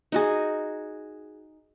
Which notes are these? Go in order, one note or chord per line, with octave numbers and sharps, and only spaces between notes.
D#4 F#4 G#4